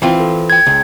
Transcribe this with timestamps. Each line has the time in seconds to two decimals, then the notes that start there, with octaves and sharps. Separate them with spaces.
0.02 E3 C4 F4
0.20 A4
0.50 G5 G#6
0.67 C#2